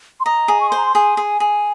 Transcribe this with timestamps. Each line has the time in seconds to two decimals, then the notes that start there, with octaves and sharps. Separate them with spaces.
0.20 C6
0.25 D#5 A#5
0.48 G#4
0.61 C#6
0.69 C5 C6
0.77 A#5
0.85 C6
0.95 G#4 G#5
1.17 G#4
1.40 G#4